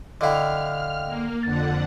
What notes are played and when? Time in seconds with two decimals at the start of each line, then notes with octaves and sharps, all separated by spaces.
0.21 D3 E4 D#5 F5 G5 F6
1.06 A#3
1.43 F2 D3 F#5 A6